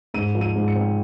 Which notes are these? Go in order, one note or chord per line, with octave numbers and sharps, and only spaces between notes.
G#2 D#7
F3
D#7
G#2
C#7
C4